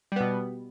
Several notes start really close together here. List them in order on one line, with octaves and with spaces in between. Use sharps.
G3 B3 B2